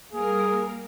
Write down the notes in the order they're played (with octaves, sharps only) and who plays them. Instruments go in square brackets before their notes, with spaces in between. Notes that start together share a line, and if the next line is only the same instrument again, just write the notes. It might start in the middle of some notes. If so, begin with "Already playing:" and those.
[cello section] G3 A#3 A#4 [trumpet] G#4